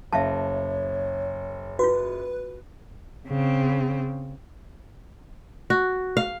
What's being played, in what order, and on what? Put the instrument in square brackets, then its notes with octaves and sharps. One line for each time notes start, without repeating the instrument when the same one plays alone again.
[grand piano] F#1 [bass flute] C#5 [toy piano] E5 F5 A5
[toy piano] F4 F#4 [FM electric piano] B4
[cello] C#3 C4
[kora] F#4
F5